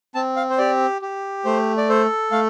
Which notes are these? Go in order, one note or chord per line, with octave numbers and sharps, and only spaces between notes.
C4 A5
F5
C5
G4 D5
G4
A3 C5
D5
A4 C5
A3 F5